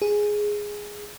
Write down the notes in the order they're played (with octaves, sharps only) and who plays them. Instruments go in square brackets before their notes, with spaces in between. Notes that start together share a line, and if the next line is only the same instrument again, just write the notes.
[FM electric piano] G#4